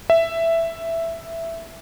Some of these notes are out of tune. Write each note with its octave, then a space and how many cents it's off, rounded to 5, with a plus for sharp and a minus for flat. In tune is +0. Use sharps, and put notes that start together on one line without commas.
E5 +5